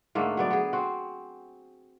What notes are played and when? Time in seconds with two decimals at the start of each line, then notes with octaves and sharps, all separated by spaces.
0.15 G#2 D3 A3 A#3
0.37 F#3 B3 D5
0.50 B3 G#4
0.73 C4 F#4